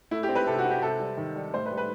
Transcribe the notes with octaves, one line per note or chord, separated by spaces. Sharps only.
A3 E4
G4
C4
B4
C3 A4
F#4
C4
G4
C3 A4
G3
D#3
G3
A2 C5
B4
G3
B4